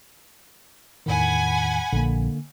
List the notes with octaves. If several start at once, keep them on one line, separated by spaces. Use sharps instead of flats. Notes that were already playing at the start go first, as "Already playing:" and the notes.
E2 A2 D#3 F#5 G#5 B5
A#1 D3 A#3